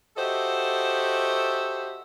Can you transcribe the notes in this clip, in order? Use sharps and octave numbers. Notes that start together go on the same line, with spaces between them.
F#4 G4 A4 C5 D#5 E5